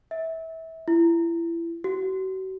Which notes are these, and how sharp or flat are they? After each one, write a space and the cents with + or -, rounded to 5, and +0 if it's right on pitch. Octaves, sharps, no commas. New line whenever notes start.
E5 -25
E4 +30
F#4 +40